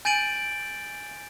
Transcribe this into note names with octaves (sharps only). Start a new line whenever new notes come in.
G#5 G6 A6 D7 D#7 F#7